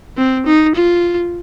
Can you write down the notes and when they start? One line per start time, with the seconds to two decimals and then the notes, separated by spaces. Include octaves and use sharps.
0.17 C4
0.46 D#4
0.75 F4